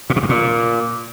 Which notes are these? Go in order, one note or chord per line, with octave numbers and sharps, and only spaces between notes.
A#2
B2
G2
A#2